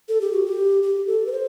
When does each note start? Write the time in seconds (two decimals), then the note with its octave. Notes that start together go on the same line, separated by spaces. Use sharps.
0.09 A4
0.21 G4
0.32 F#4
0.46 G4
0.83 G4
1.07 A4
1.27 B4
1.32 C5